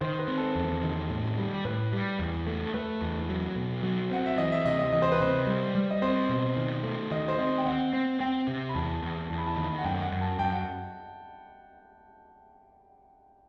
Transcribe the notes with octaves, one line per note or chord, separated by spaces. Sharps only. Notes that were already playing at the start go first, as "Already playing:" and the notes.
D#3 C5
B4
C4
A4
E2
D#3
A2
G3
A2 B4
G3
E2
A3
A4
A3 B4
E2
F#3
B2
F#3
C4 F#5
E5
E3 D#5
E5
C3 D#5
D#5
E3 D#5
C5
B4
C3 C5
G3
G3
D#5
C4 C5
B2
D#3
A3
D#3 D#5
C5
C4 D#5
G5
C4 F#5
C4
C4 G5
C3
B5
E2 A5
E2
E2 A5
B5
A5
D#3 B5
A5
F#5
F#2 G5
F#5
F#2
A5
F#2 G5
F#5